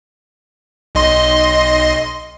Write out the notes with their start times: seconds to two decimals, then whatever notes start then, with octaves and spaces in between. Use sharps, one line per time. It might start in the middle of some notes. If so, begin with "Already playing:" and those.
0.95 B1 D#5 C6